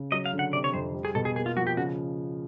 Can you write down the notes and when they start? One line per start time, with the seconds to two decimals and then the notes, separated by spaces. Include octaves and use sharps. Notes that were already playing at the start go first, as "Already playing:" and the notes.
Already playing: C#3
0.12 F#3 D#5
0.26 F5
0.33 D3
0.39 F#5
0.53 C3 D5
0.64 C#5
0.73 F2 C5
0.94 G3
1.05 G#4
1.15 B2 A4
1.25 G#4
1.35 A#3 G#4
1.46 F4
1.57 F3 F#4
1.67 G4
1.77 C#3 F#4